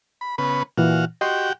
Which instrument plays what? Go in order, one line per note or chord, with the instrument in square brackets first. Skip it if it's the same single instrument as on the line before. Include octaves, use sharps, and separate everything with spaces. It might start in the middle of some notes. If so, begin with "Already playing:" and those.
[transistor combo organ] B5
C#3 B3 B4
[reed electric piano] A#2 E3 [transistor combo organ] F#4 F5
[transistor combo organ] F#4 G4 G5 [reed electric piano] D#5 C6 C#6